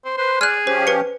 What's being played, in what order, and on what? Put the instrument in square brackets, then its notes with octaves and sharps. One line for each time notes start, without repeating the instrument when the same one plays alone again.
[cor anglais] C5
[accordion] B4 [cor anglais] C5
[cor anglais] G#4 [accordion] D5 [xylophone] F6 F#6
[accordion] F3 C#4 G4 [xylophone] C5
[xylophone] B4 C#7